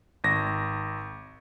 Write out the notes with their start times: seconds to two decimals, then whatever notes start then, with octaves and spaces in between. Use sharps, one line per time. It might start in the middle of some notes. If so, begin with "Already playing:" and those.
0.24 G#1 A#6